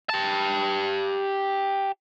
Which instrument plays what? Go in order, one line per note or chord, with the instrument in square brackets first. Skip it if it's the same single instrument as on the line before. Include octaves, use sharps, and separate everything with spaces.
[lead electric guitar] G4 A5